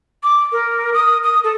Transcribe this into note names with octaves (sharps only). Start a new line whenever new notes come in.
D6
A#4
D#6
D#6
A4